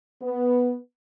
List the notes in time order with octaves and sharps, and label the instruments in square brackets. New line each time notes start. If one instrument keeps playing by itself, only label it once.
[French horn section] B3